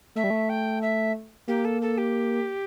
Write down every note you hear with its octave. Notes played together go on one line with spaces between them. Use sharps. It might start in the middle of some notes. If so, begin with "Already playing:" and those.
A3 E5
G3
A3
G5
E5
A#3 G4
A4
A4
G4